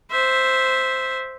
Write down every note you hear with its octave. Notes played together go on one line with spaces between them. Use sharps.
C5 E5